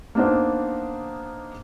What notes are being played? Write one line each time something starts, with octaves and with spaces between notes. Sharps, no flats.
A#3 B3 D4 D#4 C5